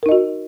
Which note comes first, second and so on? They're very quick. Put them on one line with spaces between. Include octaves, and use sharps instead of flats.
A#4 D#4 D#5 F#4